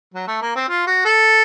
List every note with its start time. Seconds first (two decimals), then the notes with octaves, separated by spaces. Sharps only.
0.14 F#3
0.28 A3
0.42 A#3
0.55 C4
0.68 F4
0.87 F#4
1.05 A4